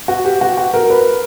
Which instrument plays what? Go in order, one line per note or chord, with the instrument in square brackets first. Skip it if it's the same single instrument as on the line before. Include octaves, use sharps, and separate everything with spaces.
[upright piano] F#4
G4
F#4
F#4
A#4
B4